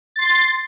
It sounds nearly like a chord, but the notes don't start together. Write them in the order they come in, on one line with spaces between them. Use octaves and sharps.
A6 C6 C7